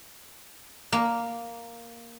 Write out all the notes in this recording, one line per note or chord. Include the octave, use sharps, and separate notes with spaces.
A#3